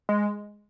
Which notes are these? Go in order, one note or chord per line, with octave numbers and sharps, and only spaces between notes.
G#3